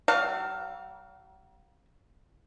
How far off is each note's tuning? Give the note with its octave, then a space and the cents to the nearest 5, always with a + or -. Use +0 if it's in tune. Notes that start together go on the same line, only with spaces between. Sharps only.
F#3 +45 F5 +10 A#5 -45